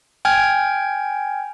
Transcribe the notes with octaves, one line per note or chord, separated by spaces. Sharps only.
G5 G#5 F6 G#6